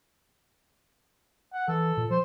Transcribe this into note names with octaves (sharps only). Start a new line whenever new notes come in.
F#5
E3 A4
A#2
F3 C5